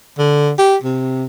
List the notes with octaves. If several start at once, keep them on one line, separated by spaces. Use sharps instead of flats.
D3
G4
C3